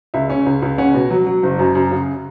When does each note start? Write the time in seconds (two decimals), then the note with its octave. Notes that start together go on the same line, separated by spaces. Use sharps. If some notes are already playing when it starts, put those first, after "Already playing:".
0.14 C#2 E5
0.30 C#4
0.46 C#2
0.62 C#2
0.78 C#4 F#5
0.94 B2
1.10 F#3
1.27 F#3
1.43 F#1
1.59 F#2
1.75 F#2
1.91 C#3